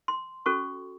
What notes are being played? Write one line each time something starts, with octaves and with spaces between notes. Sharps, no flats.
C6
C#4 F#4 A4 C#6